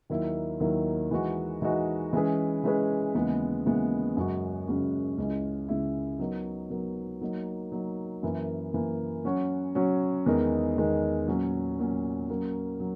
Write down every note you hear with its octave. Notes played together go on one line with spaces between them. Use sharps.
D#2 D#3 F#3 A#3 E4
D#2 D#3 F#3 A#3 E4
E3 G#3 D#4 F#4
E3 G#3 D#4 F#4
E3 G#3 C#4 G#4 B4
E3 G#3 C#4 G#4 B4
D#2 C#3 E3 G#3 B3
D#2 C#3 E3 G#3 B3
F#2 C#3 G#3 C#4 F#4
F#2 C#3 G#3 C#4 F#4
C#2 C#3 G#3 C#4 E4
C#2 C#3 G#3 C#4 E4
F#3 B3 D#4 A#4
F#3 B3 D#4 A#4
F#3 A#3 D#4
F#3 A#3 D#4
F#2 E3 A#3
F#2 E3 A#3
F#3 C#4 F#4 C#5
F#3 C#4 F#4 C#5
E2 D#3 G#3 D#4 A#4
E2 D#3 G#3 D#4 A#4
A#2 F#3 C#4
A#2 F#3 C#4
F#3 A#3 C#4
F#3